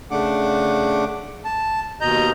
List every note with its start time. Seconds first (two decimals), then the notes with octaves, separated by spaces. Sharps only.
0.11 C#3 A3 D4 F#5 D6
1.45 A5
2.01 D#2 B2 D#5 A#5 G6